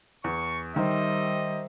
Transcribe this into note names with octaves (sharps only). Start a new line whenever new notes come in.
E2 C#6
D#3 G3 C5 D#5 E5